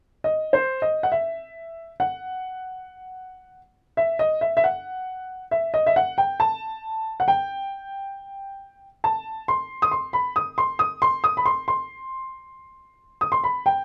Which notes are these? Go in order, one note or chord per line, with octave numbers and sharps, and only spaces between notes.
D#5
C5
D#5
F#5
E5
F#5
E5
D#5
E5
E5
F#5
E5
D#5
E5
F#5
G5
A5
F#5
G5
A5
C6
D#6
C6
B5
D#6
C6
D#6
C6
D#6
B5
C6
C6
D#6
C6
B5
G5